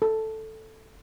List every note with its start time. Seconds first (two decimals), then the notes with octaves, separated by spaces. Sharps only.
0.02 A4